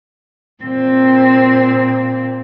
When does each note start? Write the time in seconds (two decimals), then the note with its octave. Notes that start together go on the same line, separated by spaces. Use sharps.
0.64 A#2 C4